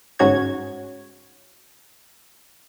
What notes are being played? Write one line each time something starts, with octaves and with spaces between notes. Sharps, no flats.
G1 G#2 C#4 F#4 C#5 G#6